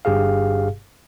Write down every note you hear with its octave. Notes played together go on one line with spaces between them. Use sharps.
G1 G2 G4 G#4 F5